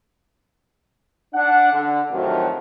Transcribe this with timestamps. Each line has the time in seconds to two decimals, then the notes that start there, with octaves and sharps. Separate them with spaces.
1.33 D4 F#5
1.73 D3
2.12 F2 A2 C3 D#3 F3 F#3